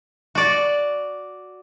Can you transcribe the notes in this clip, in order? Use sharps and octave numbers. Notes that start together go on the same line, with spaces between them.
F#4 D5